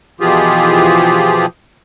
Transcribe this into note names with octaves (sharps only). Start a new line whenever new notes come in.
B2 E3 F3 F4 G4 G#4